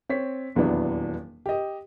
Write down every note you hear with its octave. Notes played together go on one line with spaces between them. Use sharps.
C4 C#5 B6
D#1 E2 E3 F#3 B3 D4
G4 D#5